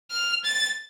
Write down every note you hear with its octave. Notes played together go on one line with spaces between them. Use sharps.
F6
A6